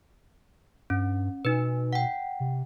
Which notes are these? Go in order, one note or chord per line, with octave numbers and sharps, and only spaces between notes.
G2 C#4
B2 D#4 B4
F#5 G5
C3